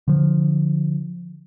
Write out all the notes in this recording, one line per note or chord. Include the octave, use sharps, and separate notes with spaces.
D3 F3